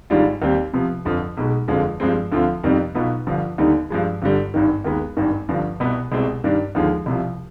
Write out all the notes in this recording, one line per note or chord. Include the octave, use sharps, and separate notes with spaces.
G#1 G#2 G3 D4 F4
D#2 D#3 G3 C4 G4
C3 F3 B3
G1 F2 D3 F3
B1 B2 G#3
G1 F2 D3 F3 G#3
G2 F3 G#3 C4
D2 D3 F3 C4 F4
F2 C3 D#3 G3 B3
B1 B2 B3 F4
G1 G2 F3
D#2 D3 G3 B3 D#4
G2 F3 G#3
G1 G2 D3 G3
G#1 G2 D#3
D#2 D#3 G#3 B3
G#1 G2 D#3
G1 G2 F3
C2 B2 B3
C2 B2 G#3 C4
G2 D#3 G3 D4
D#2 D3 F3 G#3
C2 C3 F3